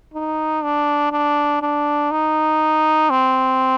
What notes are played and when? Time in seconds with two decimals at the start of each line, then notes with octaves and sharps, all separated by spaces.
0.14 D#4
0.63 D4
1.12 D4
1.62 D4
2.11 D#4
3.10 C4